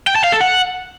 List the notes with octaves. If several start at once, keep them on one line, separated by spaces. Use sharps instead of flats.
G5
A5
F5
A4
F#5